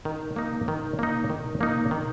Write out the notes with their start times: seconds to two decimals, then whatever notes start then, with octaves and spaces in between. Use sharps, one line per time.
0.05 D#3
0.36 A#3 D#4
0.68 D#3
0.99 A#3 D#4
1.30 D#3
1.61 A#3 D#4
1.91 D#3